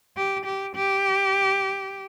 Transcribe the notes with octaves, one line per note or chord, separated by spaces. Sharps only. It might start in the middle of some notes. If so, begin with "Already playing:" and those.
G4
G4
G4